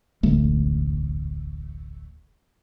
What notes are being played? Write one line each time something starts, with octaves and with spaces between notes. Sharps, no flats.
E1 A1 D2 A3